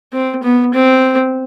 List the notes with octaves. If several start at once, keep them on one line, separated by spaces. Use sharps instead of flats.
C4
B3
C4